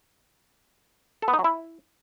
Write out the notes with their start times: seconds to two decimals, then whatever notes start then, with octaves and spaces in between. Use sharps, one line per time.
1.22 A4
1.28 B3
1.33 D#4
1.39 F#3
1.44 E4